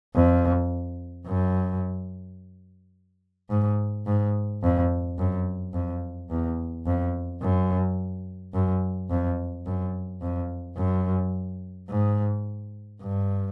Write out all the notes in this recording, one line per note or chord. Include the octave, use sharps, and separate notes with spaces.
F2
F#2
G#2
G#2
F2
F#2
F2
E2
F2
F#2
F#2
F2
F#2
F2
F#2
G#2
G2